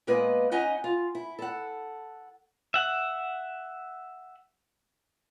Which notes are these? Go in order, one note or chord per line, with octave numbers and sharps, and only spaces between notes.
A#2 G#3 A#3 B3 B4 D#5
C#4 D#4 D#5 F#5 G#5
F4
E4
A4 F#5
E5 F#5